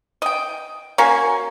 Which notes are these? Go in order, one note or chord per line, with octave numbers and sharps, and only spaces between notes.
D#5 G5
A#3 C#4 F#4 G#5